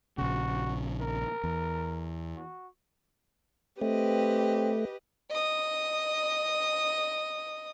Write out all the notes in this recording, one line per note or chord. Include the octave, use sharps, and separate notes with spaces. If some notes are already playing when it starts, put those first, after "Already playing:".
A#1 C#3 F#4
A#4
E2
F#4
A3 C4 G4 B4 D#5
D#5 D#6